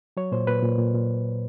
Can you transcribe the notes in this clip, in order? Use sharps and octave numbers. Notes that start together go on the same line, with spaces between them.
F#3 C#5
A#2 C5
A#2 B4
A#2
A#2
A#2